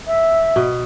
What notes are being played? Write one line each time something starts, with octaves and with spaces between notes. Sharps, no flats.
E5
B2